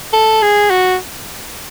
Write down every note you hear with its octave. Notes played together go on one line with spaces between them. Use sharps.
A4
G#4
F#4